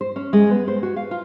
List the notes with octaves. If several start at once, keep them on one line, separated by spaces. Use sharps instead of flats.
C5
C#4
G#3
B3
C5
F#4
F5
F4